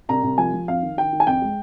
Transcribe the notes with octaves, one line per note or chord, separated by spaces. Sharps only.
C2 A#5
C2
F3 G#5
F3
F2 F5
D#3
D#3 G5
D#3
G#5
F2 G5
G#3